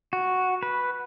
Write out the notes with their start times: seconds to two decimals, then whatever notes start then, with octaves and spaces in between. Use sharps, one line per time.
0.13 F#4
0.63 B4